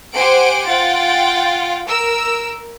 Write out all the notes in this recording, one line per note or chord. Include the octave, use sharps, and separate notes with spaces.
G4 C5 F#5 G#5 D7
F4 F#5 G5 A6
A#4 E6